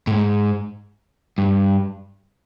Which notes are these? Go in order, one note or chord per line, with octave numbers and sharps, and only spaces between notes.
A2
G#2
G2